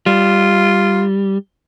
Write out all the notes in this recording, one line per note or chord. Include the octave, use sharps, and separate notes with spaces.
G3 F4